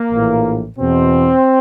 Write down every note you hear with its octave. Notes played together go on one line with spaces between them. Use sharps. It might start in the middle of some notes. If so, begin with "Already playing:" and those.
Already playing: A#3
A#1 A2 E3
E2 B2 C4